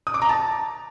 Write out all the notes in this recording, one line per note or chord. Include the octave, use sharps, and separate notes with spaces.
D#6
D6
A#5
A5